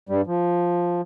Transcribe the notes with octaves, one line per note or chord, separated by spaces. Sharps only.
G2 G3
F3